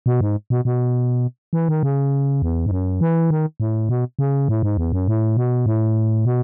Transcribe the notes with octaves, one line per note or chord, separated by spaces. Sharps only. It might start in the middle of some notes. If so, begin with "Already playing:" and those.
B2
G#2
B2
B2
E3
D#3
C#3
E2
G#2
F#2
E3
D#3
A2
B2
C#3
A2
G#2
E2
F#2
A2
B2
A2
B2